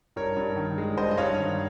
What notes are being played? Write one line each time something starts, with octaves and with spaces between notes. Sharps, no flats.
G2 A#4 C#5
G2
D#3
G#3
G2 C5 D#5
D#5
G2 C#5 F5
D#3